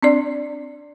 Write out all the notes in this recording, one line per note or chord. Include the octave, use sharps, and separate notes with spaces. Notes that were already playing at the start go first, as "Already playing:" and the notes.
C4 D4 D5